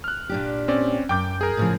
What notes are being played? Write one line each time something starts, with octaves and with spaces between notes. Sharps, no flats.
F6 F#6
A#2 D4 G4
C4 C#4 D5
F#2 G5 D6 G6
G#4 A#4
A2 C#3 F3